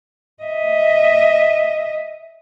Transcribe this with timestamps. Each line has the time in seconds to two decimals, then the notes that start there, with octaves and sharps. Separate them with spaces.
0.42 D#5 E5